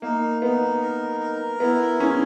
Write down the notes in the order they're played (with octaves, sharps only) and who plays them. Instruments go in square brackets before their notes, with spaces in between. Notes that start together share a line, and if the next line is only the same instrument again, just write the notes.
[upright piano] A#3 [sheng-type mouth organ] D#4
[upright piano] B3 [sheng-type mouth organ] D#4
[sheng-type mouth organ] A#4
A#4
[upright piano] B3 [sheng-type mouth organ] E4
[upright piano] C#4 [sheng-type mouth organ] G#4